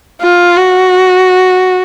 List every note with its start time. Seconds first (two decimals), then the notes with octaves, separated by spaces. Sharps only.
0.22 F4
0.57 F#4